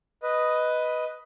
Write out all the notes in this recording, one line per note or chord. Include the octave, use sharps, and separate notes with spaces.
B4 D#5